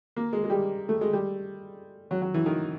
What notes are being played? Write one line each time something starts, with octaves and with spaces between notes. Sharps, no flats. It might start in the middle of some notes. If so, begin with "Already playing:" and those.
A#3
G#3
G#3
G3
A3
G#3
G3
F#3
F#3
E3
D#3